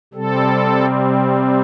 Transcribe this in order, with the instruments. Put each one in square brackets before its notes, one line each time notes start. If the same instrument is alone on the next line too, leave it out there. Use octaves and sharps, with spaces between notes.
[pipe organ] C3 G3 C4 A4